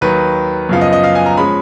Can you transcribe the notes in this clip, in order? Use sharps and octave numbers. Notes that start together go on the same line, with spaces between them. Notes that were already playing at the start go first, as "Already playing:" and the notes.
D#2 D#3 F#3 B4
F#2 C#3 F3 B3 F5
D#5
D#5
F5
G#5
A#5
F3 G#3 C#4 B5